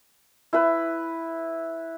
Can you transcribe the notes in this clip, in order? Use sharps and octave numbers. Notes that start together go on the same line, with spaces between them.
E4 B4